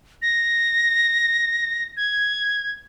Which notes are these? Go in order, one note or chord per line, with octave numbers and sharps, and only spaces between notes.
A#6
G#6